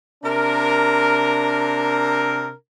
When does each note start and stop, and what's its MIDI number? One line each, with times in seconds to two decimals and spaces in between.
0.24 2.52 48
0.24 2.52 62
0.24 2.52 70